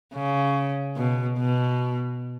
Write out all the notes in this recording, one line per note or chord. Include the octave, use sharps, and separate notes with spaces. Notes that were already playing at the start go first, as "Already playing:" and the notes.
C#3
B2
B2